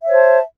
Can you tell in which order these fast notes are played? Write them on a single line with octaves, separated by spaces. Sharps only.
E5 C#5 C5 A5